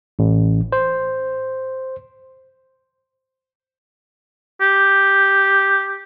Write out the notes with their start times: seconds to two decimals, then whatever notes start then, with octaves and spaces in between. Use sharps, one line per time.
0.19 A1
0.72 C5
4.61 G4